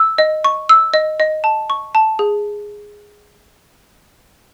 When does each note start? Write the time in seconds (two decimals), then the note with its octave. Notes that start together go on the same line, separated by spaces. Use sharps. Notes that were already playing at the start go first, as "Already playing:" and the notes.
Already playing: E6
0.18 D#5
0.44 C#6
0.69 E6
0.94 D#5
1.20 D#5
1.44 A5
1.70 C#6
1.95 A5
2.19 G#4